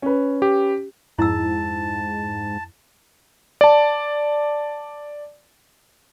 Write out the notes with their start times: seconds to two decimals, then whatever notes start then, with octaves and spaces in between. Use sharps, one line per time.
0.02 C#4 B4
0.42 G4
1.19 F2 G#2 E4 A5 E6
3.61 D5 A5